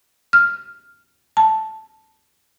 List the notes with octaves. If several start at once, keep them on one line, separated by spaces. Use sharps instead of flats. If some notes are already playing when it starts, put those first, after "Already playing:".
F6
A5